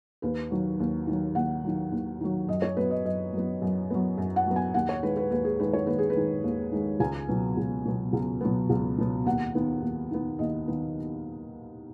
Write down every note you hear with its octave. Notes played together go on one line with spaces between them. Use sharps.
D#2 B4
D#3 F#3
D#2
D#3 F#3
D#2 F#5
D#3 F#3
D#2
D#3 F#3
F#2 D#5
C#5
F#3 B3 B4
D#5
F#2 D#5
F#3 B3
F#2
F#3 B3
F#2
F#5
F#3 B3
G#5
D#2 F#5
C#5
D#3 G#3 B4
B4
D#2 B4
G#4
D#3 G#3 B4
C#5
D#2 B4
G#4
B4
D#3 G#3
D#2
D#3 G#3
C#2 G#5
B2 F#3 B3
C#2
B2 F#3 B3
C#2
B2 F#3 B3
C#2
B2 F#3 B3
D#2 F#5
D#3 B3
D#2
D#3 B3
D#2 D#5
D#3 B3